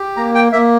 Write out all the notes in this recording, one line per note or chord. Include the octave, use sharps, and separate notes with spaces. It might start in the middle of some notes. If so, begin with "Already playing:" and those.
Already playing: G4
A#3 A#5
G5
A#3 E5